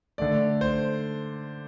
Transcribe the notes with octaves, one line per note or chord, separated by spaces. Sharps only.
D3 A3 D5
C5